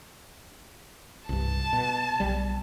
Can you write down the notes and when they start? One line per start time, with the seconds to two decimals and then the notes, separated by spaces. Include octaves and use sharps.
1.29 C2 G2 A5
1.73 B2
2.20 B1 G3